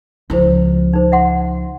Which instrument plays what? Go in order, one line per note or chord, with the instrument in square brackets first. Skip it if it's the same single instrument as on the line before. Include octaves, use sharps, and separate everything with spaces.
[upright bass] C#2 F3 [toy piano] E4 C5
[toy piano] D#4 C5
E5 F#5 C6